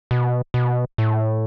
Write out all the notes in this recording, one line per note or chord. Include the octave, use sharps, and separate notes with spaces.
B2
B2
A2